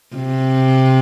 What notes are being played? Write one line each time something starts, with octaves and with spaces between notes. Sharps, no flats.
C3